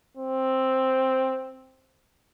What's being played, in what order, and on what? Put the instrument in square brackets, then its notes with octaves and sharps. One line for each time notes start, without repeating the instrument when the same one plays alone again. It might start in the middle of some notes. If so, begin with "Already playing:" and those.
[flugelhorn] C4